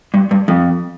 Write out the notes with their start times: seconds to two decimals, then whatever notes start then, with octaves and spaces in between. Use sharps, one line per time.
0.14 G2
0.31 G2
0.48 F2